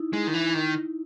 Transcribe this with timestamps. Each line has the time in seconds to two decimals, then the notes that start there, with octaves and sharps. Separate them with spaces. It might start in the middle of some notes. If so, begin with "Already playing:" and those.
Already playing: D#4 E4
0.13 G#3
0.27 D#3
0.34 E3
0.54 D#3